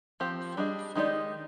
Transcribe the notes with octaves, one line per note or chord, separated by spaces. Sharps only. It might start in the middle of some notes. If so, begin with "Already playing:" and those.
F3 C4 G4
G3 D4 G#4 D#5
D#3 G#3 D#4 G4 D5